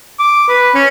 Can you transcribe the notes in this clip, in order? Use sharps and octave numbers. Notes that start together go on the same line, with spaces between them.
D6
B4
C#4